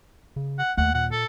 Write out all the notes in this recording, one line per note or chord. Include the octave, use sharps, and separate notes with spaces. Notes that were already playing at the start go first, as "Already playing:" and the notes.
C#3
F#5
D#2 A3 F#5
A#2 F#5
A4